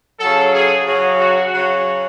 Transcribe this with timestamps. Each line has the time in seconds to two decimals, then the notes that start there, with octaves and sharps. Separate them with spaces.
0.20 C#3 F#3 A4
0.54 G#4
0.86 C#3 F#3 G#4
1.20 F#4
1.53 C#3 F#3